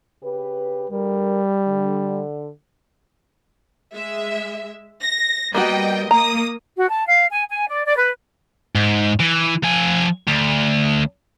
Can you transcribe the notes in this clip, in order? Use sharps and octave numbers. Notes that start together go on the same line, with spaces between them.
C#3 G4 B4
D2 D3 G3 A#4
D3
G#3 E5
A#6
G3 A#3 B3 F#4 D#5 G5
A#3 A#5 D#6
F#4
A5
F5
G#5
G#5
D5
D5
B4
G#2
E3
F3 G#5
D2